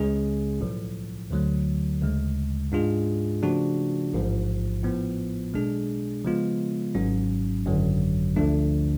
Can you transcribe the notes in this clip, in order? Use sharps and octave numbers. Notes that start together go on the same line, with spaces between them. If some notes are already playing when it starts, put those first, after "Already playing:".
Already playing: C#2 C#3 G#3 C#4 G#4
B1 A2 F3
D2 D3 F#3 A3
D2 C#3 G#3
G#2 G#3 D4 F4 G#4
C#3 F3 A3 D4 F#4
A1 G#2 F3
A2 F3 B3
B1 B2 G#3 D4 G#4
C#3 F3 G#3 B3 F4
G#1 G#2 F#3 C#4
G#1 F#2 D3 F#3
D2 D3 F3 A3 D4